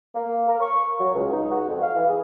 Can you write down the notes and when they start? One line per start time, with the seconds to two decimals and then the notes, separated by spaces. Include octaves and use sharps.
0.14 A#3
0.47 A#4
0.60 C#6
0.99 F#3
1.14 C#2
1.32 D#4
1.51 F#4
1.67 F2
1.81 F5
1.95 E3
2.07 G#4